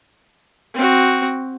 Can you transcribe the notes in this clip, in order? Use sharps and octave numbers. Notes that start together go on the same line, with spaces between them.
C4 F#4